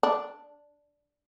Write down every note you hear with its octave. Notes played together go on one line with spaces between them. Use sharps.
D4